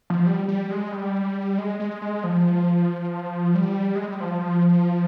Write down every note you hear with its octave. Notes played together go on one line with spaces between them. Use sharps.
F3
G3
G3
G#3
G3
G#3
G#3
G#3
F3
G3
G#3
G3
F3